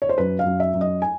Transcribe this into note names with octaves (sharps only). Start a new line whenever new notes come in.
C#5
C5
F#2 B4
F5
F#2
E5
F#2
D#5
G#5